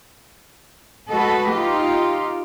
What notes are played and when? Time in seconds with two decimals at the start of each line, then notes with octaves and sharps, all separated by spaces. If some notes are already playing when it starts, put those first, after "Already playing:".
1.10 G#3 F#4 A4 B4 D#5
1.50 D#4 F4 G4